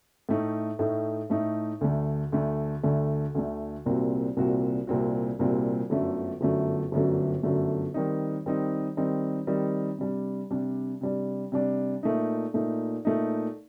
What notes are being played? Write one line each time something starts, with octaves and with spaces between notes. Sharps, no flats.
A2 A3 D#4
A2 A3 D#4
A2 A3 D#4
D2 D3 A3
D2 D3 A3
D2 D3 A3
D2 D3 A3
C2 A#2 G3 C4 F#4
C2 A#2 G3 C4 F#4
C2 A#2 G3 C4 F#4
C2 A#2 G3 C4 F#4
G1 F#2 D3 F#3 A3
G1 F#2 D3 F#3 A3
G1 F#2 D3 F#3 A3
G1 F#2 D3 F#3 A3
D#3 G3 C4 D#4
D#3 G3 C4 D#4
D#3 G3 C4 D#4
D#3 G3 C4 D#4
C3 G3 D4
C3 G3 D4
C3 G3 D4
C3 G3 D4
A#2 A3 D#4
A#2 A3 D#4
A#2 A3 D#4